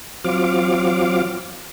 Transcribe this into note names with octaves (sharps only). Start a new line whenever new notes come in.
F3 F#3 C4 F5 D6